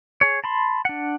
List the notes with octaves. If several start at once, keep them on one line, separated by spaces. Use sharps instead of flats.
G#4 C#5
A5 B5 C6
D4 F#5